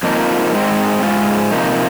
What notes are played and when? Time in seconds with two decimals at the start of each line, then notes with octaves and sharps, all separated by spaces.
0.03 F2 F3 A#3 D#4
0.52 G#2 G#3 C4
1.02 G#2 G#3 F4
1.51 C3 F3 A#3 D#4